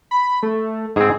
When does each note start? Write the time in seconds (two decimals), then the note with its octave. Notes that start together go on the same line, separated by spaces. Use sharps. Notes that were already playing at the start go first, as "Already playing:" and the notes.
0.11 B5
0.43 A3
0.96 G#2 C4 G#4